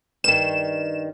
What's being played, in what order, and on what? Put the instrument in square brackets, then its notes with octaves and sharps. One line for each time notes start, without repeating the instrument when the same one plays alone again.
[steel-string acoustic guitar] G2 D#3 [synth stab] E7